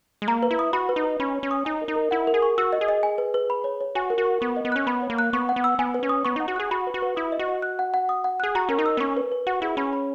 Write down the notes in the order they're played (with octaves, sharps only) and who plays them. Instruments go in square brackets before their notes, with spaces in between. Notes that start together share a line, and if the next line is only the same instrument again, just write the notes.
[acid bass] G#3
[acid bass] A#3 [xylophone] A#5
[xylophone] B4
[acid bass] E4
[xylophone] D#6
[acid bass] F#4 [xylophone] B5
[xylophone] B4
[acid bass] D#4
[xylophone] B4
[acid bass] C#4 [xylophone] B5
[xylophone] C#5
[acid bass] C#4
[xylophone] D#6
[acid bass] D#4 [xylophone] G#5
[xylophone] A#4
[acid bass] D#4
[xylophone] A#4
[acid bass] E4 [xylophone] F#5
[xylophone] A#4
[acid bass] G#4
[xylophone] C#6
[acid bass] F#4 [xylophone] E6
[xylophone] D#5
[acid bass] G#4
[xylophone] D#5
G#5
B4
B4
B5
C#5
C#5
[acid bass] F#4 [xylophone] G#5
[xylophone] A#4
[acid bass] F#4
[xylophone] C#6
[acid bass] B3 [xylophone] C#6
[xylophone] D#5
[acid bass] B3
[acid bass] C#4 [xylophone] F#6
[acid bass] B3 [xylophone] B5
[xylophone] C#5
[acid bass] A#3
[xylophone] F#6
[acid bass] B3 [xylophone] C#6
[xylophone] F#5
[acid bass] B3
[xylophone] E6
[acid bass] B3 [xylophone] G#5
[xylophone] B4
[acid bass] C#4
[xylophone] D#6
[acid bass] B3 [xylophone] C#6
[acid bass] D#4 [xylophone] F#5
[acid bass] F#4
[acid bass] G#4 [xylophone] F#6
[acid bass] F#4 [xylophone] B5
[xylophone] B4
[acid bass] F#4
[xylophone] B4
[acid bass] E4 [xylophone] D#6
[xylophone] D#5
[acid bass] F#4
[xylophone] D#5
F#6
F#5
F#5
D#6
F#5
[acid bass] G#4 [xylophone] F#6
[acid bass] F#4 [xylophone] A#5
[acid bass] C#4 [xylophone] A#4
[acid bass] D#4
[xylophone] E6
[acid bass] B3
[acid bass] C#4 [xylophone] C#6
[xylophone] B4
B4
[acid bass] F#4 [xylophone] F#5
[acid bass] E4 [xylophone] G#4
[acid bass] C#4 [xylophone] B5
[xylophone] B5